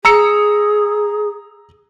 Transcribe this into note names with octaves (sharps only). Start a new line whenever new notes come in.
G#4 A#5 E6 C#7